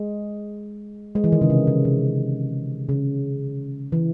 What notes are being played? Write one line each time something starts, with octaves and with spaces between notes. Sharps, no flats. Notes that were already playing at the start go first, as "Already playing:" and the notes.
Already playing: G#3
G#3
E3
D#3
C#3
C3
C#3
C3
C#3
E3